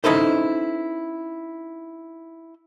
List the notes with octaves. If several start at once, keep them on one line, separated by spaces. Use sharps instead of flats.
C#4 D#4 E4 A4 B4 C5